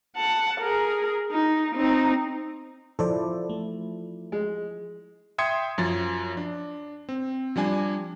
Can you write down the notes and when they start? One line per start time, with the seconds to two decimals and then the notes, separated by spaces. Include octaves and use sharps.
0.16 F#5 A5
0.61 G#4 A#4
1.31 D#4
1.75 C4 D#4
2.99 F3 E4 A4 C5 D5
3.50 A3
4.32 G#3
5.38 E5 G5 C6 D#6 G#6 C#7
5.78 F#2 F3 A6
6.37 D4
7.09 C4
7.56 F3 G3 D4 G#5